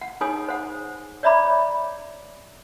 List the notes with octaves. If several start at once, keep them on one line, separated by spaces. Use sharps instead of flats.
F#5
D#4 G#4 C#5 G#5 D#6
C5 F#5
C#5 D5 E5 A#5 B5 D6